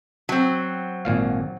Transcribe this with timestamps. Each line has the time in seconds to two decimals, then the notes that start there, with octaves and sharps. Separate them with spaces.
0.29 F#3 C4
1.05 G#1 A#2 F5